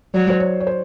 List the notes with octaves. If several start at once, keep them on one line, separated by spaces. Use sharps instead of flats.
F#3 D5
C5
C#5
C#5
C5